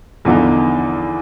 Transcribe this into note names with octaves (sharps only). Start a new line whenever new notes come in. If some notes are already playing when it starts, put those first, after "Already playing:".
E2 D3 F3 B3 D#4